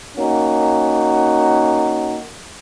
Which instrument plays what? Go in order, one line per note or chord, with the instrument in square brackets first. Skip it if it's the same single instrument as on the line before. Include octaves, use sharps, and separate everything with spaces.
[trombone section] A#3 C#4 D#4 F#4